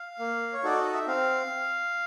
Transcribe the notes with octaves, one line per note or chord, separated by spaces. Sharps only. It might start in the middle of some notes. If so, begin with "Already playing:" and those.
Already playing: F5
A#3
C#5
D#4 F#4 A4 D5
D#5
E5
C4 F5